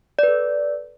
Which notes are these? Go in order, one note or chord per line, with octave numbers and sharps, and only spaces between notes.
A4 B4 D5